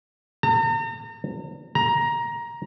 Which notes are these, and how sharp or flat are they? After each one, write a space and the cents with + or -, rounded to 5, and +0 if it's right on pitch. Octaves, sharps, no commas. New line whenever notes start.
A#5 -40
A#5 +15